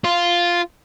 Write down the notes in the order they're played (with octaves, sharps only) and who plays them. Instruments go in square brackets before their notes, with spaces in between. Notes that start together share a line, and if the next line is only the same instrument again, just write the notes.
[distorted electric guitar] F4